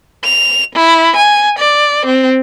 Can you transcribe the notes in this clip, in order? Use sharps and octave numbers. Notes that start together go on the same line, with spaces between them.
F7
E4
G#5
D5
C4